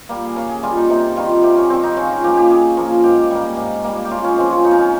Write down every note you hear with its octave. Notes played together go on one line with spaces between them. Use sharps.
G3 A#3
G#4
C#3 A#4
G#4
G3 A#3 F4
D#4
C3 D#4
D#3 G3 F4
C3 G4
C#4
D#3 G3 C4
D#4
C#3 C#4
F4
F3 A#3 G4
G4
C#3 G#4
F3 A#3
G#2 G4
G3 A#3
G#2
G3 A#3
G4
C#3 F4
C#4
F3 G#3 C4
C#4
C#3 D#4
C#4
D#4